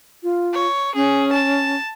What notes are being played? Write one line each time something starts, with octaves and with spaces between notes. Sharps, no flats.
F4
C#5
C#4 G#4
A5